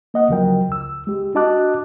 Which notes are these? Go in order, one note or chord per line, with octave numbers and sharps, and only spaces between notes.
A#3 D#5 F#5
D2 C#3 F3 F#3 A#4 G5
C#2 E6
G#3 G4
D4 F#4 D#5 A5 D6 F#6